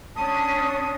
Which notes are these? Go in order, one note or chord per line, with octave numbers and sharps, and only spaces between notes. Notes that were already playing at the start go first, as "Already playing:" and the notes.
C#4 D4 A5 D#6